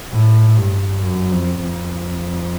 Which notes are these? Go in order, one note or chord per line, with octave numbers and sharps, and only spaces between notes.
A2
G2
F#2
F2
F2